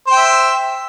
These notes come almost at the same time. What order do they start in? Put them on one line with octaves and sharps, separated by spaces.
C5 G5 E5